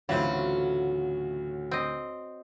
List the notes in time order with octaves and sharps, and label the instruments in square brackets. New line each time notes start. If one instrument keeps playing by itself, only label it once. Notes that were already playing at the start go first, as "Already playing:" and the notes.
[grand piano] D2 A2 F4 [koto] C#3 E3 C4 [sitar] F#3
[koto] C4 D#5